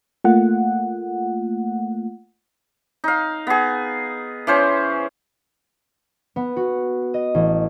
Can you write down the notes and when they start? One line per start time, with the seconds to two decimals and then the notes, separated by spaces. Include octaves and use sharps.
0.24 A3 A#3 F4 F#5
3.04 D#4 F5
3.47 B3 G#4
4.47 E3 C#4 C5
6.36 B3
6.56 F#4
7.14 D#5
7.34 A1